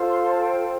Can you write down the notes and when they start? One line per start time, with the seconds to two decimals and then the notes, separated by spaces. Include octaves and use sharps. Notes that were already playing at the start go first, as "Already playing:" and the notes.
Already playing: F4 A4 C5
0.09 C6
0.19 C6
0.30 A5
0.40 G5